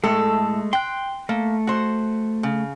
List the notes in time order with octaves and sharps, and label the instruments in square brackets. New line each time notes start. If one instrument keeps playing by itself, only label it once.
[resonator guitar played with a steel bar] A2 A4 [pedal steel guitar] G#3 A3
[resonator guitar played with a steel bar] G5 [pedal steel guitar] C6 F#6
[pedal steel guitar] A3 [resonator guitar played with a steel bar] A#3
[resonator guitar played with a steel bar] F#4 C5
C#3